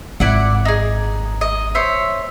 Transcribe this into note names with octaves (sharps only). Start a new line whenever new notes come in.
G#1 E4 D5 F#5
D#4 G#4
D#5
C5 C#5 E5